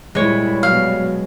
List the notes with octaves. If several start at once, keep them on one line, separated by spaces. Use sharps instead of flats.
A#2 G3 G#3 E4 C#5
B2 F#3 F5